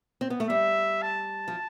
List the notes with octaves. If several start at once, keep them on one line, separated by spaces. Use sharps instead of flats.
C4
B3
A3
G3 E5
A5
F3